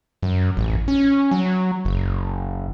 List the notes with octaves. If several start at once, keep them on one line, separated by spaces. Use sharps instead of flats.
F#2
A1
C#4
F#3
F#1